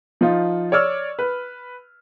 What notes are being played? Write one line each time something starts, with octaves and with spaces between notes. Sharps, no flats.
F3 D#4 F4
C#5 D5 E6 F6
B4